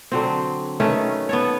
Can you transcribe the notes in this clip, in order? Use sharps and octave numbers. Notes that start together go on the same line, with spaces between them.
D3 F#3 C4
D#3 A3 C#4 B4
B3 A4 C#5